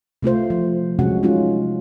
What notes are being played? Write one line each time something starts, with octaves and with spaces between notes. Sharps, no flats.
C3 A3 F4 C5
F3
C3 F#3 G#3 C#4 F#4 F#5
G#3 C#4 D#4 F4